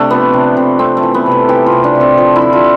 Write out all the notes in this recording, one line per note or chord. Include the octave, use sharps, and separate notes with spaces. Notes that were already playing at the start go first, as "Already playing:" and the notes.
Already playing: C3 A3 D4
F3 B3
C3
C3
A3 C4
A3
E3
B3
C3
A4
E3 G4
F4
C3
D4
C3
C4
F3
E4
D3
F4